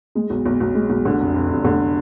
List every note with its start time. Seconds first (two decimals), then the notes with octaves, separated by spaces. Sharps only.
0.15 G#3
0.30 B1
0.45 B1
0.60 B1
0.75 G#3
0.90 B1
1.05 D3
1.19 F1
1.34 F1
1.50 F1
1.64 D3